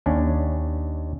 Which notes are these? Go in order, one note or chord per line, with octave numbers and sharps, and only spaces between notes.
D#2 C#4 D4